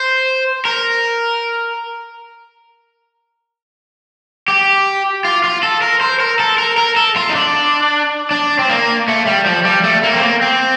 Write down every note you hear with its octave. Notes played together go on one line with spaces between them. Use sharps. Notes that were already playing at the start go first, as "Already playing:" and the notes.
Already playing: C5
A#4
G4
F4
F4
A4
A#4
C5
A#4
A4
A#4
A#4
A4
F4
D#4
D4
D4
C4
A#3
A3
G3
F3
G3
A3
A#3
C4
A#3
C4